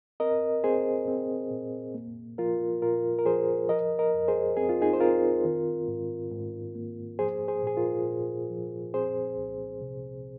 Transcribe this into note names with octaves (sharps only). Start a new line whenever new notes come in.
C4 A#4 D#5
C4 G#4 C5
C4
A#2
A#3
F3 F4 A#4
A#2 F4 A#4
A#4
F3 G#4 C5
F3 A#4 D#5
A#4 D#5
F2
G#4 C5
C4 G#4
F4
D#4 G#4
C5
C4 F4 A#4
D#3
G#2
G#2
A#3
F3 G#4 C5
G#4 C5
A#2 G#4
F4 A#4
A#2
F3
C4 G#4 C5
C2
C3